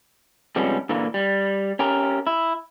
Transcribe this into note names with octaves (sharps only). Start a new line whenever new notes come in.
C3 F3 G3 G#3 B3 C#4
A#2 D3 E3 A#3
G3
C#4 G4 A#4
E4